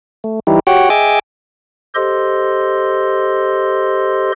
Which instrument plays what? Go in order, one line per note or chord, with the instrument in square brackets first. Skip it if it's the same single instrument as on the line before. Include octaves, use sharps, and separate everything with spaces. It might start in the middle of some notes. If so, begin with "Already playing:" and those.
[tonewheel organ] A3
E3 G3 D#4 E4 G4
F#4 G4 C#5 F#5 G5
G#4 D#5 E5 G5 G#5 D6
[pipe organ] G4 A4 C5 D#5 C6